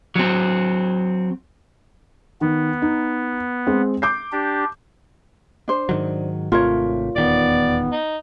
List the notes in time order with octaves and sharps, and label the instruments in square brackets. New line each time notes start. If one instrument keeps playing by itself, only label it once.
[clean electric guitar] F#3 C4
[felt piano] D#3 [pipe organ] B3
[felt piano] D#4
G#3 C4
D6 G6 C7
[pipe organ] D4 G4
[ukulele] D4 C5
[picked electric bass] G#2 D#3 F#3
[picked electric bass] G#1 C3 A3 [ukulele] F4 A#4 C#5
[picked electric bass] D#1 E2 D#3 [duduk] B3 [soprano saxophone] D5
[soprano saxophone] D#4